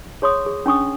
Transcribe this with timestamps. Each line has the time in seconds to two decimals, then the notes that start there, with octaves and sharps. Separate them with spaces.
0.22 G#4 C#5 C6 C#6 D#6
0.46 G#4
0.66 C#4 D4 C#6 D#6